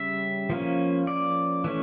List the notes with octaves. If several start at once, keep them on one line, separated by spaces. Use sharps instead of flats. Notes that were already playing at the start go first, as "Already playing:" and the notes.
Already playing: C#3 G3 C#4 E5
F3 A#3 C#4
D5
E3 A3 C#4